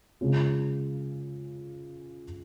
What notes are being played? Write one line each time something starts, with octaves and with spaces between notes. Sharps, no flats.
C#3 G#3 C#4 F4